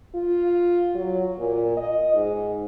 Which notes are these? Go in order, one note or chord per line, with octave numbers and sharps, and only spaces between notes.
F4
F#3
A#2
D#5
G#2